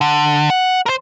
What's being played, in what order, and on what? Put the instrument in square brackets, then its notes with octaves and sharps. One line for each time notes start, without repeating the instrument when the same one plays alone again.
[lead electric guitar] D3
F#5
A#4 C5